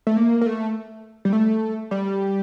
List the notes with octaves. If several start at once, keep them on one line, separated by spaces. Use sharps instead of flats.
A3
A#3
A#3
A3
G3
A3
G3